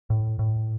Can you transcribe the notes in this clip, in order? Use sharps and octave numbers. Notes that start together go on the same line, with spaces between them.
A2
A2